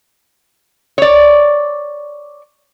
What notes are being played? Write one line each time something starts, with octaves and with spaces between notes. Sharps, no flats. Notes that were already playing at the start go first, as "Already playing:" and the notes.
C#5 D5